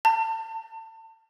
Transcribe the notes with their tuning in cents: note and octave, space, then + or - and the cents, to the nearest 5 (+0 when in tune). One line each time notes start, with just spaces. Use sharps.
A5 +30